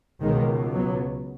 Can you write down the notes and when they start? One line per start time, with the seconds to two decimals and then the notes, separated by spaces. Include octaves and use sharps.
0.22 C#2 B2 D#3 G#3
0.74 F#3 B3